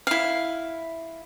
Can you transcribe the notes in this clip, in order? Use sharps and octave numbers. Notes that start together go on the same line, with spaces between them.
E4 F5